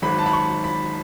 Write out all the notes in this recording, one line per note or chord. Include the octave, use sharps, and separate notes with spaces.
G#1 G#2 F#3 B5
A5
B5
C#6
B5